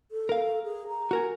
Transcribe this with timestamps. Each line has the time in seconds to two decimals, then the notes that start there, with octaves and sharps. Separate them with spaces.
0.12 A4
0.29 A#4 F5
0.64 G#4
0.88 A#5
1.11 F#4 A#4 G#5